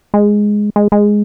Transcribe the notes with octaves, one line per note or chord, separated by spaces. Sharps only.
G#3
G#3
G#3